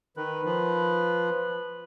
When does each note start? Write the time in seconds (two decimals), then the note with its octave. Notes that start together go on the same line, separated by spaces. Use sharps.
0.17 D#3 B4
0.45 F3